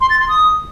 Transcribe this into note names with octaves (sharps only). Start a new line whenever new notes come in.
C6
A6
C6
D#6